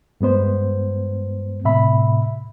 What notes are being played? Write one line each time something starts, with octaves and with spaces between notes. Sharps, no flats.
G2 G#3 B3 C5
A2 C3 E5 B5